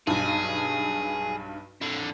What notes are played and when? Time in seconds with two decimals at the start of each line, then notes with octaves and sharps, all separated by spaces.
0.07 B1 G2 G#4
1.81 F2 D3